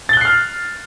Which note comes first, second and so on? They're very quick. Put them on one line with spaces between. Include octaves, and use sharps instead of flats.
A6 G7 F#6 C7 F6